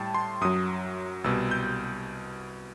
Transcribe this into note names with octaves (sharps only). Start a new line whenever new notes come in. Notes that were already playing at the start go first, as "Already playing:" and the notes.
Already playing: A2 G3 G5 A5
C6
F#2 F#3 D#6
C2 B2 G3 E6
G6